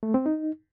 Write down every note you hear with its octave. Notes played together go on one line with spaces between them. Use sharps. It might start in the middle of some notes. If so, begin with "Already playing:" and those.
A3
C4
D#4